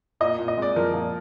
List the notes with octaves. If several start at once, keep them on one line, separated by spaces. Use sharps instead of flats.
A#2 D#5
A#2
D#5
G#3 D5
F3 A#4
A#2